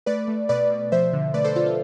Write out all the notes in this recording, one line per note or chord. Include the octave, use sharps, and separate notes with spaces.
A3 B4 D5
A3
B2 B4 D5
B2
F3 C5 E5
D3
A3 B4 D5
A4 C5
D3 F4 A4
F4